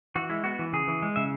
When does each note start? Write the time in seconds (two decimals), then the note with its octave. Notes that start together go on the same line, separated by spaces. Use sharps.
0.15 E3 F#4
0.30 G#3 E4
0.44 B3 F#4
0.59 E3
0.73 C#3 G#4
0.88 E3
1.02 G#3
1.16 C#3 E5